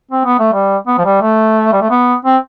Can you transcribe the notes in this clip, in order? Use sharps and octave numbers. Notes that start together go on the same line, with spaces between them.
C4
B3
A3
G3
B3
F3
G3
A3
G3
A3
B3
C4